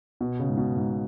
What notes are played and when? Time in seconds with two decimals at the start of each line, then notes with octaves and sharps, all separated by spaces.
0.21 B2
0.40 C#3
0.49 G#2
0.57 B2
0.76 G#2